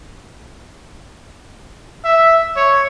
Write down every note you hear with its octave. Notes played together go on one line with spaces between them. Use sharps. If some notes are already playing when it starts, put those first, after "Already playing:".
E5
C#5